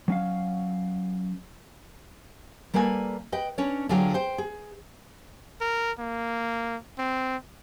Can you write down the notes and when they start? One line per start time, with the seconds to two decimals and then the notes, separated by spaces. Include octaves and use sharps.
0.08 F#3 C#4 F5
2.74 G3 A#3 A4 B4 G#5
3.32 B4 D#5 G5
3.58 C#4 D4 B4 C#5
3.89 D3 F#3 F4 G#4 C#5 G5
4.14 C5 G5
4.38 G#4
5.61 A#4
5.99 A#3
6.99 C4